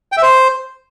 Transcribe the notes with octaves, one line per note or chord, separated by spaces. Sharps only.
G5
E5
C5